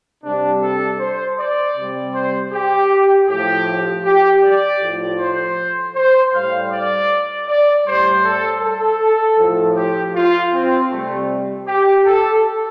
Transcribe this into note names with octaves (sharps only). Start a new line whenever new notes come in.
C3 G3 D4
A4
C5
D5
C3 G3
C5
G4
A2 F3 G4
G4
D5
A2 F3
C5
C5
A2 G3 F5
D5
D5
A2 G3 C5
A4
A4
A2 F3
G4
F4
C4
C3 G3 A3
G4
A4